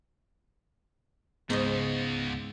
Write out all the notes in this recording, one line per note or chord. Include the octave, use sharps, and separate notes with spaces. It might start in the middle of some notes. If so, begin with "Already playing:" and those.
C#2 G#2 B3 D#4 D#5